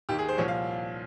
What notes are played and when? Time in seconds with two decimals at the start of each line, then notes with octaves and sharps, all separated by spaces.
0.09 D#2 D#3 G4
0.19 G#4
0.29 C5
0.38 C2 A#2 F3 C#5
0.48 F5